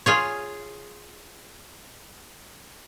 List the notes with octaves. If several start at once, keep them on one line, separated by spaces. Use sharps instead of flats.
F4 G#4 C#5